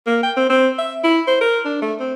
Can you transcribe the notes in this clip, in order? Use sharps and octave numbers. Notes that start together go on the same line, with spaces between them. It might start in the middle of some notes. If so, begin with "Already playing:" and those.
A#3
G5
C4
C4
E5
E4
C5
A#4
D4
A3
C4